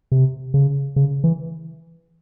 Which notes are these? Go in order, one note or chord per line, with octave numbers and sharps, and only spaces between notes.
C3
C#3
C#3
E3